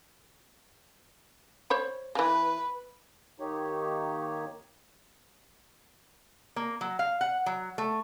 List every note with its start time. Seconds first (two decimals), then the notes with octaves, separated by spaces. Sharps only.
1.70 C5 C#5 B5
2.15 C#3 E3 B4
3.40 D#3 A#3 D#4 G4 C#5
6.56 A#3
6.81 F#3
6.99 F5
7.21 F#5
7.46 F#3
7.78 A3